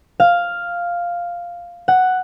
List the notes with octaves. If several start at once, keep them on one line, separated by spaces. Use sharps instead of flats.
F5
F#5